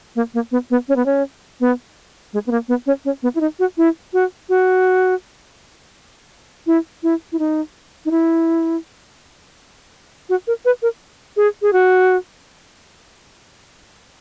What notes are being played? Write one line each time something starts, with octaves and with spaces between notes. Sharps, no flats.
A#3
A#3
B3
B3
C#4
B3
C#4
B3
G#3
B3
A#3
B3
C#4
C#4
B3
E4
D#4
F#4
E4
F#4
F#4
E4
E4
E4
D#4
D#4
E4
F#4
A#4
B4
A#4
G#4
G#4
F#4